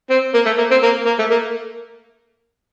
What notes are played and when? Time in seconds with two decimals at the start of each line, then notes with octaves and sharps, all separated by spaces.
0.10 C4
0.34 A#3
0.45 A3
0.58 A#3
0.71 C4
0.83 A#3
1.06 A#3
1.19 A3
1.31 A#3